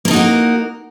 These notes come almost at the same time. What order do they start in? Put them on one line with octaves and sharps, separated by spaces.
A#3 D4 D#4 F#4 A#4